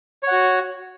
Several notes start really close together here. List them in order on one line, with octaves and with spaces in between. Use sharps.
C#5 F#5 F#4